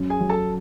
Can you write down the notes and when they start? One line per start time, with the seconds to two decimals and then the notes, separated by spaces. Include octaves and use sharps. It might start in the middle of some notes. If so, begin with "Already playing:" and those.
Already playing: F#2
0.10 G#4 G#5
0.20 F#3
0.29 A4 A5